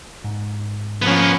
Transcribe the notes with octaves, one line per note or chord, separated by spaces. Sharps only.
G#2
F3 A#3 B3 C#4